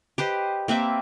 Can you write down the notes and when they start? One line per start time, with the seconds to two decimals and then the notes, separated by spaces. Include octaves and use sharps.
0.18 G4 B4 C5 D#5
0.68 A#3 C4 B4 E5